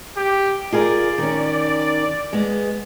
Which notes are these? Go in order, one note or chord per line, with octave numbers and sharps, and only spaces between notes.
G4
F4 G#4 A#4 D5
D#3 C#4
G#3 B3